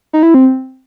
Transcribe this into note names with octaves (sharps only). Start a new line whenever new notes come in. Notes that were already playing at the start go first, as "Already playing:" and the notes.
D#4
E4
C4